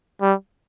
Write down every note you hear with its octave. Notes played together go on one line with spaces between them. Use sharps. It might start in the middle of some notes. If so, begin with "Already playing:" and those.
G3